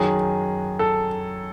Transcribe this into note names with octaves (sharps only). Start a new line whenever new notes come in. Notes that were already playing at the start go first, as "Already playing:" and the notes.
Already playing: F#2 D#3 F#3 G#4
A4